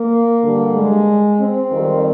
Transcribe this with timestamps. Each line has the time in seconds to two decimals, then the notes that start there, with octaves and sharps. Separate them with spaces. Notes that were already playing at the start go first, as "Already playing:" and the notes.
Already playing: A#3
0.42 G2 D3 G3
0.74 G#3
1.39 C4
1.71 F2 D#3 G3